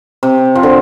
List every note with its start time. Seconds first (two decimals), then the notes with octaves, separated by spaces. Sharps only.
0.23 C3
0.55 F3
0.63 D3